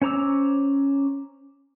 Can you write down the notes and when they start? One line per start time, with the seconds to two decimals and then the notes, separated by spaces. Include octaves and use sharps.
0.02 C#4 C5 A#5 D6 E6